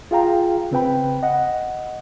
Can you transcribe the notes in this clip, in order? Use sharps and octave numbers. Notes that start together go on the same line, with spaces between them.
F4 G#4 F5 G5 A#5
C#3 C4 B4 G5 B5
D#5 F#5